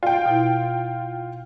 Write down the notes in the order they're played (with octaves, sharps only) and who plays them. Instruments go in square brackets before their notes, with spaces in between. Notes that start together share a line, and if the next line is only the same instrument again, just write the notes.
[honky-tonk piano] F4 G5
[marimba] B2 E4